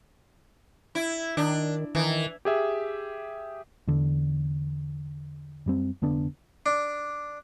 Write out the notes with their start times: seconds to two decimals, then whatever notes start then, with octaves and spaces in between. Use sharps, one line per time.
0.95 E4
1.37 D#3 D4
1.95 D#3 E3
2.45 G4 G#4 E5
3.87 E2 D3
5.66 F#2 G3 C4
6.02 F1 D3 B3 D4
6.66 D4